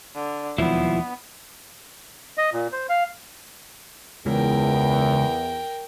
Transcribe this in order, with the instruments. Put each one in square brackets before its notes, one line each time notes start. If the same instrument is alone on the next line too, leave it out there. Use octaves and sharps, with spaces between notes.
[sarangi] D3
[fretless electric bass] E1 D#2 F#3 [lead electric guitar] F3 E4 [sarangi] B3
[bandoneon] D#5
A#2
C5
F5
[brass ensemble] E2 [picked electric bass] C#3 G#3 [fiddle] A#4 G5